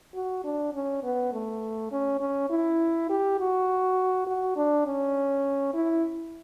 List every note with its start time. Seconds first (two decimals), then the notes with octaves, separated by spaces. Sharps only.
0.15 F#4
0.44 D4
0.74 C#4
1.03 B3
1.33 A3
1.92 C#4
2.20 C#4
2.50 E4
3.09 G4
3.39 F#4
4.27 F#4
4.56 D4
4.86 C#4
5.74 E4